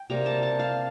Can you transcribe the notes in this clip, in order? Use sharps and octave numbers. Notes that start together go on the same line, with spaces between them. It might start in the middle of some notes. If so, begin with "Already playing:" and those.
Already playing: G5
C3 G3 A#3 A#5
A5
A5
F5